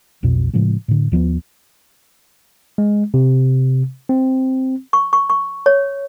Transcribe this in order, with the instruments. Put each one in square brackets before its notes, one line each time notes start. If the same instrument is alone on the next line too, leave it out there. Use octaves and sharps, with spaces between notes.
[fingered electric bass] B1 F2 B2
A2 C#3 F3 G#3
A2 D3
D#2 F3 A#3 B3
[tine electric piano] G#3
C3
C4
[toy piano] C#6
C#6
C#6
C#5